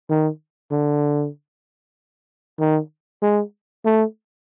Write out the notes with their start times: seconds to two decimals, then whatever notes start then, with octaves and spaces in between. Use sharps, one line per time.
0.10 D#3
0.72 D3
2.60 D#3
3.22 G#3
3.85 A3